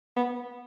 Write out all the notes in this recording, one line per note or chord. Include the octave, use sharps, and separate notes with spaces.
B3